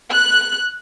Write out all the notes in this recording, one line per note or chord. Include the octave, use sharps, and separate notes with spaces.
F#6